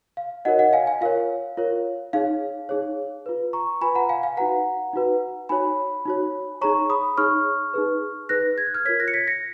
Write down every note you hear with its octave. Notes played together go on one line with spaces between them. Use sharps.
F5
D#4 F#4 A#4 C#5 D#5 F#5
D#5 F#5
F5 G#5
F5 G#5
F4 A#4 C#5 F5
F4 A#4 C#5
D#4 G#4 C#5 F5
D#4 G#4 C#5
F4 B4
A#5 C#6
F4 B4 G#5 B5
F#5 A#5
F5 G#5
F5 G#5
D#4 F#4 B4 F#5 A#5
D#4 F#4 B4
D#4 F#4 C#5 G#5 B5
D#4 F#4 C#5
D#4 G#4 C#5 A#5 C#6
B5 D#6
D#4 G#4 C#5 C#6 F6
D#4 G#4 B4
D#4 G#4 B4 F#6 A#6
G#6
F#6
F6 G#6
F4 A#4 C#5 G#6 B6
F#6 A#6
C#7
G#6 B6
A#6 C#7